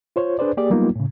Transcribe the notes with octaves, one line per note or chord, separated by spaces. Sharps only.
F4 C5 C#5
D4 G#4 B4 C5 D5
A#3 G4 G#4 D5
F#3 G3 A#3 B3 D#4 F4
A2 C#3